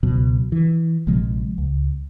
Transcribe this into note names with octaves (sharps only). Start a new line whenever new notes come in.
C#2 B2 F#3
E3
A#1 C3 F3 G#3
C#2